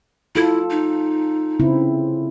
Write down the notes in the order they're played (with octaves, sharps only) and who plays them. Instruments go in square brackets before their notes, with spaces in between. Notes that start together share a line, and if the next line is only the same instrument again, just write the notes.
[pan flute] E4 [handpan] F4 A4
[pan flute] D#4
[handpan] C#3 C4 E4